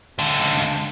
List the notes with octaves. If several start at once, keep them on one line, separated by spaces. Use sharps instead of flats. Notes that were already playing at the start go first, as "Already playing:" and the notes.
C#2 D3